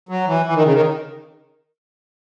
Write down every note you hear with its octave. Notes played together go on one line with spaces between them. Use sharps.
F#3
E3
E3
D#3
C#3
D#3